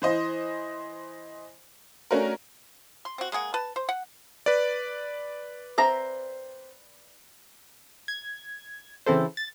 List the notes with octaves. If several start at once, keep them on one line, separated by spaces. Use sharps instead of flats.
E3 C5 D#5
A3 C#4 D4 F#4 A#4
C6
C4 F#4
G#3 A#3 G#4 F#5
B4 A5
C5
F#5
B4 D5
C4 E5 A#5
G#6
C#3 E3 C4 E4 A4 C5
A6